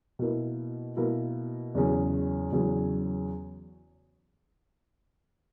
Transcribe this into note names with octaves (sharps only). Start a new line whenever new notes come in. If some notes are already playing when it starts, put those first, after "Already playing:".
B2 A#3 E4 A#4
B2 A#3 E4 A#4
E2 C#3 F#3 C#4 G#4
E2 C#3 F#3 C#4 G#4